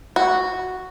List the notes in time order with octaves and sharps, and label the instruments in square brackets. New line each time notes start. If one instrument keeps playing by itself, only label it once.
[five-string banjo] F#4